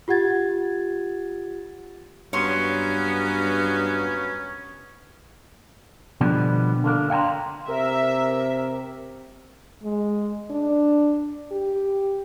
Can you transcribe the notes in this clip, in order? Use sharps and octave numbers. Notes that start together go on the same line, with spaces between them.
F4 G4 F#5 G#6 A6
G2 F#3 A#3 B3 C#4 C#5 C6 C#6
B2 D3 F3 G3 B3 D4
D3 A#3 D4
F5 G5 G#5 A#5 C6
C3 A#4 E5
G#3
D4
G4